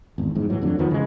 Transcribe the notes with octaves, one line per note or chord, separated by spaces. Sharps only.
G#1 E2
G1 E2 G#2
A2 E3 F#3
F2 D3 F#3
E2 D#3 F3 B3
C#3 E3 G3 G#3